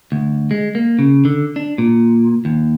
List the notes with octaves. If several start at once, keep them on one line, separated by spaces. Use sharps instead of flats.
D2
G#3
A#3
C#3
D3
D4
A#2
D#2